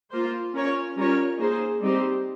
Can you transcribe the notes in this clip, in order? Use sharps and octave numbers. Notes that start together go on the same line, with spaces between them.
A#3 F4 C5
C#4 F4 A#4 C#5
G3 C#4 F4 A#4 C#5
A#3 D#4 G#4 C5
G3 C4 D#4 G4 C5